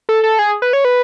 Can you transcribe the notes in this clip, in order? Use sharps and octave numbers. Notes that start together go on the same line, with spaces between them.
A4
A4
G#4
B4
C#5
B4